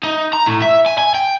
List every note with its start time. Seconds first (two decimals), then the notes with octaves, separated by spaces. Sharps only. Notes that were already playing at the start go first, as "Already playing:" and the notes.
0.03 D#4
0.33 A#5
0.47 A2
0.62 E5
0.86 G#5
0.98 G#5
1.14 G5